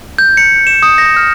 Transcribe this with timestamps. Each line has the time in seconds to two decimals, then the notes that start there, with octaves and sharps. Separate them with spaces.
0.18 G6
0.37 C#7
0.67 E7
0.83 D#6
0.98 A#6
1.16 F6